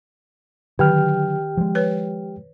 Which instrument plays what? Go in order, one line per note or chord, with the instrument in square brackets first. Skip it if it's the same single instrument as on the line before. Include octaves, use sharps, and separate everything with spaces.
[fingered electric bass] D3 F#3 [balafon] D#3 [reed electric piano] G4 G5 F6
[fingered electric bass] F3 G#3
[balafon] B4 C#5